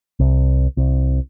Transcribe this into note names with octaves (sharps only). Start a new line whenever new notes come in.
C2
C2